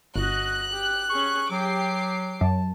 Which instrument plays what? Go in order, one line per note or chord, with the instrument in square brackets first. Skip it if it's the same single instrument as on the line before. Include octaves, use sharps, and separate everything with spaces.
[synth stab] G1 [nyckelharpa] F#4 D#5 [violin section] F#6
[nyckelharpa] G4
[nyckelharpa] C#4 G#4 [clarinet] C#6
[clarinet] F#3 [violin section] G4 D6 C7 [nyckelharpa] G5
[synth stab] F#2 [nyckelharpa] A5